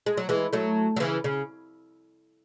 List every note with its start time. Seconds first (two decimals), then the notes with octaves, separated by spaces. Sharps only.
0.06 G#3
0.17 F#3
0.29 E3 G#3
0.53 F#3 A3
0.96 F#3
1.00 C#3 E3
1.24 C#3